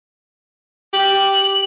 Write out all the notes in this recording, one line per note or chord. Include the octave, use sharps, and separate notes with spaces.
G4 F#7